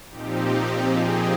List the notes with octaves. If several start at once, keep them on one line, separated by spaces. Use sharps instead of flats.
A#2 F3 C4 D#4 G4
G#4